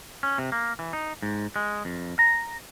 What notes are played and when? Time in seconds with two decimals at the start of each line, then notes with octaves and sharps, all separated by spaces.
0.23 C#4
0.38 C3
0.52 A#3
0.79 E3
0.93 D#4
1.22 G#2
1.56 G#3
1.85 F2
2.19 A#5